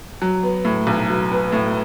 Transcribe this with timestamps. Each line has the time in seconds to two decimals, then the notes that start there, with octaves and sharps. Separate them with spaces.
0.22 F#3
0.43 B3
0.65 A2
0.87 B1
1.10 F#3
1.32 B3
1.52 A2